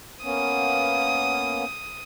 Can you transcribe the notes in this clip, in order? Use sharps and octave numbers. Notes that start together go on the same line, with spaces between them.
A#3 B3 C#4 D#6